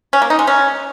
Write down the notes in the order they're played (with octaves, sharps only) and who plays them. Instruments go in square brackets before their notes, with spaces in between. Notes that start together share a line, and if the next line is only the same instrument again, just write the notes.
[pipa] C#4
A#3
D#4
G#3
C#4